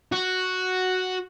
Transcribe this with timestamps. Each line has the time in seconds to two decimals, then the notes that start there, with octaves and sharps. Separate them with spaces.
0.12 F#4